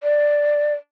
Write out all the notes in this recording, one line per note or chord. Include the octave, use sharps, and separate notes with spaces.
D5